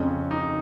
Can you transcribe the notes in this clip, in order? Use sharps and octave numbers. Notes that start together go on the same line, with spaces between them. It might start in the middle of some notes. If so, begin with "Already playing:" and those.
Already playing: F2 C#3 C#4
D#4